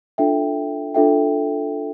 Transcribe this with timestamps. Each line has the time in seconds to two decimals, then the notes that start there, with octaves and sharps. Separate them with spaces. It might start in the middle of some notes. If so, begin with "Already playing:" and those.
0.18 D4 F4 A4 E5 G5
0.95 D4 F4 A4 E5 G5